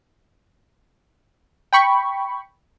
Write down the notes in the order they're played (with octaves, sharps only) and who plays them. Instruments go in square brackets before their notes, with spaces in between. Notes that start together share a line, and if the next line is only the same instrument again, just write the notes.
[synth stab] G5 B5 C#6